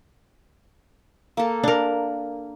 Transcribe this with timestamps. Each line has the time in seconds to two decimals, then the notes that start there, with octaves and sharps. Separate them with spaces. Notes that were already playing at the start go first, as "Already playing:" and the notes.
1.37 A#3 A4
1.63 D4 A#4